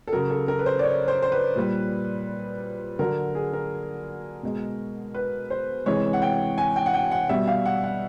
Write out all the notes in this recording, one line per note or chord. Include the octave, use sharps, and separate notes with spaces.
A4
C#3 F#3 A#4
A4
A#4
B4
C5
D5
C#5
C5
C5
B4
A#2 G3
D3 F#3 A#4
G#4
A#4
B2 G#3
B4
C5
C3 E3 G#3 C#5
F#5
G5
G#5
G5
F#5
G5
F#5
B2 G3 E5
F5
F#5
F#5